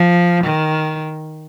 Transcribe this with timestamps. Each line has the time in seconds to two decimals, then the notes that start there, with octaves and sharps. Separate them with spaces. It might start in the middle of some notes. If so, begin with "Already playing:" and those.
Already playing: F3
0.44 D#3